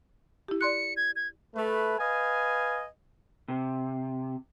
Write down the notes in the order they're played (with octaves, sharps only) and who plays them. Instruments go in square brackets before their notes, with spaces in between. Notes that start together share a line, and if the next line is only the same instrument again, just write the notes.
[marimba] E4 G4
[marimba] D5 C6 F#6 [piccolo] C#7
[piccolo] G#6
G#6
[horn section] A3 B4
B4 D#5 F5 G#5
[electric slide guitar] C3